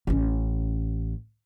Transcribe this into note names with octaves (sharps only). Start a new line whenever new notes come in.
A1 C#4